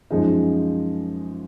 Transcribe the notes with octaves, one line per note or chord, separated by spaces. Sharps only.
F#2 F3 G#3 D#4